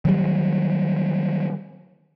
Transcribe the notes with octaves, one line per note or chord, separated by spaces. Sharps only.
D#3 F#3 G3